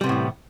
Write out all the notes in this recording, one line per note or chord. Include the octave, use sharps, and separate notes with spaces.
A2 C3 E3 G3 B3